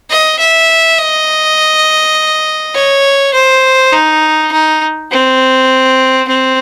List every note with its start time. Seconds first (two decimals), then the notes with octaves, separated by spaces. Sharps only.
0.10 D#5
0.39 E5
0.98 D#5
2.75 C#5
3.34 C5
3.93 D#4
4.52 D#4
5.11 C4
6.28 C4